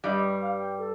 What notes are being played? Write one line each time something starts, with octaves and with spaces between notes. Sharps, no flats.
G2 G3 D#5
F5
G5
A4